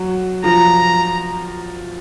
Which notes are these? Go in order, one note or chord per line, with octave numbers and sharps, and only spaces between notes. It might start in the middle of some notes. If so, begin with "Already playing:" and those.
Already playing: F#3
F3 A#5